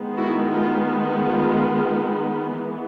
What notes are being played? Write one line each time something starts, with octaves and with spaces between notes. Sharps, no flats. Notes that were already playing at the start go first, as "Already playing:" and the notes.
Already playing: D#3 G#3 B3
E4 F#4
F4
F4
E3 G#3 B3